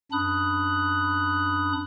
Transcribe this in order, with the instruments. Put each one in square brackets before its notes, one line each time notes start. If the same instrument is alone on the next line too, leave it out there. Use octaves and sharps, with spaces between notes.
[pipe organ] F#2 D4 B5 D#6 F#6